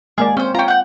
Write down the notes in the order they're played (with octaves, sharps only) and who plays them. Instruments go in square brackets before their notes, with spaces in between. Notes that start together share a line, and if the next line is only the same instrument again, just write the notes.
[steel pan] G#3 A#3 D5 [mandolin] G#4
[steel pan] C4 [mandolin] C#4 C5
[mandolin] C#4 A#5 [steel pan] F4 G5
[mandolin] F#5 G6